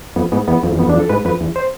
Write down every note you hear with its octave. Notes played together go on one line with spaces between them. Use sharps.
F2 B3
G#2 B3
E2 B3
F2
E2
F2 B3
E2 D4
F2
A4
G#2 B4
F2 B4
E2
C5